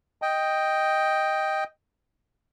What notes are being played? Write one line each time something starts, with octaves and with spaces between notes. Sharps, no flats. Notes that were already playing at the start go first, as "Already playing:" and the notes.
D#5 G5